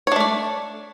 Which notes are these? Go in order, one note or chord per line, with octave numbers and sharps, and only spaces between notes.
A3 D4 C#5 D5